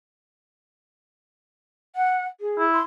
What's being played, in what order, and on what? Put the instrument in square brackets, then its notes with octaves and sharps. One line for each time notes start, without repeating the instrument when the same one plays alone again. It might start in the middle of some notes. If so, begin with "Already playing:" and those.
[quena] F#5
G#4
[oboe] E4
[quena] C6